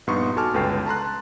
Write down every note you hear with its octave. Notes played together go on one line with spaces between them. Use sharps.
A#1 G2 B3 D#4 C6 C#6
F#4 A4 G#5 A5 D6 F6
G1 C#2 A4 B4 G5 C7
A5 A#5 C6 F#6